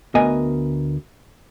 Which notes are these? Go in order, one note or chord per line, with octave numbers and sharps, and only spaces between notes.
D2 B3 A#4 D#5 G#5